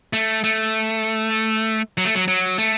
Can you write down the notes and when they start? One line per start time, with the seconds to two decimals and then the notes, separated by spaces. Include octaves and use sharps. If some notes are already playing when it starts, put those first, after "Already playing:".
0.13 A3
0.44 A3
1.98 F#3
2.05 A3
2.15 F#3
2.28 F#3
2.58 A3